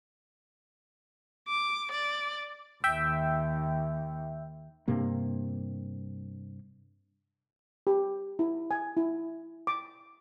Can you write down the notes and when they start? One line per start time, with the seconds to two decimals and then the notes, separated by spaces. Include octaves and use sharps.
1.48 D6
1.91 D5
2.84 D#2 E5 G5
4.88 G2 C3 A#3
7.87 G4
8.39 E4
8.71 G#5
8.97 E4
9.67 D6